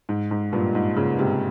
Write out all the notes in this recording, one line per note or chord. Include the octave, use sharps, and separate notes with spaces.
G#2
G#2
G2 A#2
G#2
A#2 C#3
G#2 C3